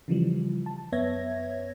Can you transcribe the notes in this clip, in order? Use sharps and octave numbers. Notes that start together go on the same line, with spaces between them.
C#3 E3 F3 G3
A5
F#2 B3 C#5 E5 G#6 A#6